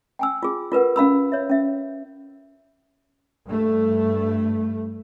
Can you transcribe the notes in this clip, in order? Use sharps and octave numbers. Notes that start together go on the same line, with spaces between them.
G5 G#5 E6
F4 G#4
F4 A#4 B4 F#5
C#4 F5 B5 E6
C#5 E5
C#4 E5
G2 A3